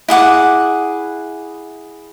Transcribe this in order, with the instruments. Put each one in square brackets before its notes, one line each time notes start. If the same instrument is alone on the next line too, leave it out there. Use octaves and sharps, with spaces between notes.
[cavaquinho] E4 G#4 F#5 D6